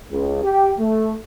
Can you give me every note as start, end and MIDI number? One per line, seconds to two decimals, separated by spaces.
0.11 0.40 37
0.43 0.72 67
0.79 1.15 57